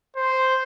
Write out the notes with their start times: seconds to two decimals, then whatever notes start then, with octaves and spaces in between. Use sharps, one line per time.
0.16 C5